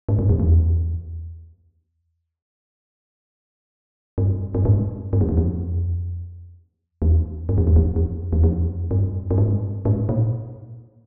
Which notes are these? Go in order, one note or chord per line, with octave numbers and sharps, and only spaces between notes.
G#2
G2
F2
E2
G2
G2
G#2
G2
F2
E2
F2
E2
G2
F2
E2
F2
F2
E2
F2
G2
G2
G#2
G#2
A#2